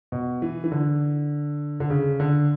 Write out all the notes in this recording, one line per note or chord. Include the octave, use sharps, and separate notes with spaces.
B2
E3
E3
D3
D3
C#3
D3